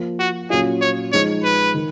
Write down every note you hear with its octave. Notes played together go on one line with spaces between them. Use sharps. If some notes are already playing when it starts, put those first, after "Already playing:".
Already playing: F3 A#3 F4
F#4
A#2 F#3 C#4 F4 G#4
C#5
F3 G#3 D#4 C#5
B4
D#3